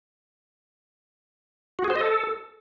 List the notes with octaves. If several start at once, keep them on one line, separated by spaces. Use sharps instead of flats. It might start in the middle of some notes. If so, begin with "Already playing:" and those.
F#4
G#4
C5
D#5
A4